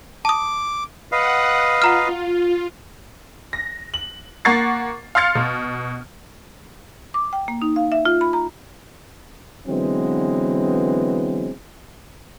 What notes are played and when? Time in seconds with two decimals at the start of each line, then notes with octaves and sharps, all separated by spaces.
0.25 A5 D6 D#6
1.12 B4 D#5 F5 F#5
1.82 F4 F#5 A#5 F6
3.53 A#6
3.94 F#7
4.45 A#3 F#5 C#6 A6 C7
5.15 F5 C6 F6 A6 C#7
5.35 B2
7.14 D6
7.33 G5
7.48 A#3
7.62 D#4
7.76 F5
7.92 E5
8.05 F4
8.21 B5
8.33 A#5
9.68 D3 E3 F#3 G#3 B3 C4